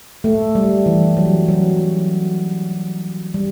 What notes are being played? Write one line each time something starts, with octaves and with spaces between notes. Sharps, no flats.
A3
G3
E3
F#3
F#3
G3